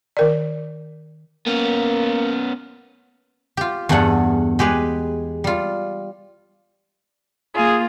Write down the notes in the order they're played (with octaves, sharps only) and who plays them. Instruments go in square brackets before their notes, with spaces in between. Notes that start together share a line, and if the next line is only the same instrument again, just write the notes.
[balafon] D#3 A#4 D5
[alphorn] A#3 [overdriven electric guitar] B3 C#4
[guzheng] F4 G4
E2 G2 A3 G#4 A4 F#5
G#3 G4 G#4 B4
G3 F4
[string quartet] A#3 F4 [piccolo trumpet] G#4